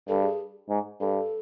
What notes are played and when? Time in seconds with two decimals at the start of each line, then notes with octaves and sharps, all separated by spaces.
0.08 G2 A4
0.23 G#4
0.69 G#2
1.00 G2 A4